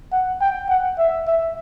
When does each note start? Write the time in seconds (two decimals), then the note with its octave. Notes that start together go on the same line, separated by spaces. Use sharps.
0.12 F#5
0.41 G5
0.69 F#5
0.99 E5
1.27 E5